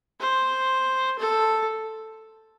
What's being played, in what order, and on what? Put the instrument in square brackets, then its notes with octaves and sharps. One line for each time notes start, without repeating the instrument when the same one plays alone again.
[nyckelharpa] C5
A4